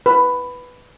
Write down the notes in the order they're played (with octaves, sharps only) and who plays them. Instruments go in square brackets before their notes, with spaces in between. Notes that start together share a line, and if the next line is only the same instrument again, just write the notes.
[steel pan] B4